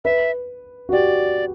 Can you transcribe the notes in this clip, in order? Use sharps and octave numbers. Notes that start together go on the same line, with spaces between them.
B4 E5
F#4
G4 D5